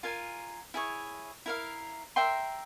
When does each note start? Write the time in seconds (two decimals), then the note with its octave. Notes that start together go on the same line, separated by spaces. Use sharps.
0.03 F4 A#4 F5 G#5
0.74 E4 G#4 C#5
1.46 E4 A#4 F5
2.16 A#4 E5 G5 C6